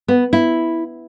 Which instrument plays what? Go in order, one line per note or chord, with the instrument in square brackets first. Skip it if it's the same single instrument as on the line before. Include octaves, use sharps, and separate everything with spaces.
[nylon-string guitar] B3
E4